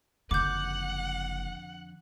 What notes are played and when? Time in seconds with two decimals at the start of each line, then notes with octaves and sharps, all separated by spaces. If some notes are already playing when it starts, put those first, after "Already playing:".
0.31 F#1 F2 D3 F#5 D6 G6